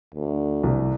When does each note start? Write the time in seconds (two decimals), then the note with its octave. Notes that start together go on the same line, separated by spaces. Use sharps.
0.14 D2
0.63 C2